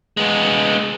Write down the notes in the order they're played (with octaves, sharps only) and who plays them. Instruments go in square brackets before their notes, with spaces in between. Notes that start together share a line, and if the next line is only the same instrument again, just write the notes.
[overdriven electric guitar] G#3 B3